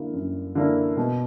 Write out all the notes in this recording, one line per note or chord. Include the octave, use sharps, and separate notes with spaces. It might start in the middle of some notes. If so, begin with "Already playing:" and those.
Already playing: D3 A#3 E4
F#2
D3 A#3 E4
B2